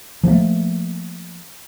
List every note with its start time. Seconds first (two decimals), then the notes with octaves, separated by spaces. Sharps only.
0.24 F3 F#3 A3 A#3